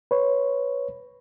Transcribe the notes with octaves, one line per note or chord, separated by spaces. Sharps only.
B4 C#5